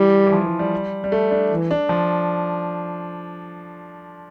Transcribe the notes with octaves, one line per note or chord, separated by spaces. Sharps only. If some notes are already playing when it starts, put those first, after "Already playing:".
Already playing: E3 G3
E3
F3
E3
G3
G3
A3
D4
E3
D4
F3